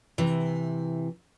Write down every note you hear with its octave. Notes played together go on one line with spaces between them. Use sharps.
C3 E3